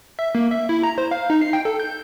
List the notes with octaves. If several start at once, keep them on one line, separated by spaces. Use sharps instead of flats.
E5
A#3
E5
E4
A#5
C5
F5
D#4
C7
G5
A4
G6